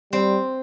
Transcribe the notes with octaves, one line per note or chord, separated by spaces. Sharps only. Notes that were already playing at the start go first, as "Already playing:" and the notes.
G3 C4